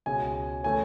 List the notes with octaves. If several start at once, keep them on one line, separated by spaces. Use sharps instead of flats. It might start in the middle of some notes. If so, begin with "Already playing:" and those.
C#2 B2 G#3 C#4 G#5
C#3 E3 A3 C#4 G#5